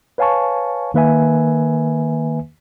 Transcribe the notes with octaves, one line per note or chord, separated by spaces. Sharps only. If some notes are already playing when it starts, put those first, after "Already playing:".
B4 C#5 F5 G#5 A5 C#6
D#3 A#3 B4 E5 G#5